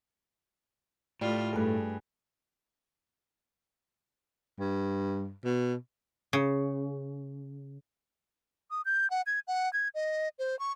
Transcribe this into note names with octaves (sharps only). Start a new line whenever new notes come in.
A2 G3 A3 F4
G2 A3 G#4 A4 B4
G2
B2
C#3
D#6
G6
F#5
G#6
F#5
G#6
D#5
C5
C#6